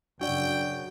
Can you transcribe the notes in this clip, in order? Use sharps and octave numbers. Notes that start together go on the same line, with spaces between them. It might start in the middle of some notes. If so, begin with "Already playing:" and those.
F#2 C#3 D4 F#4 D5 G5